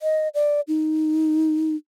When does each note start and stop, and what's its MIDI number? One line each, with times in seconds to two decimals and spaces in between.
0.01 0.28 75
0.34 0.61 74
0.68 1.76 63